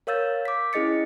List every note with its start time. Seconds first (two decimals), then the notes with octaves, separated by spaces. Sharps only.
0.07 A#4 C#5 F5 E6 G6 A6
0.45 D6 B6
0.73 C#4 E4 G#4 D#5 A6 C#7